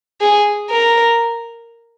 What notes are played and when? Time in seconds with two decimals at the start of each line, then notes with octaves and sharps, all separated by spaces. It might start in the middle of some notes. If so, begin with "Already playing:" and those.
0.21 G#4
0.71 A#4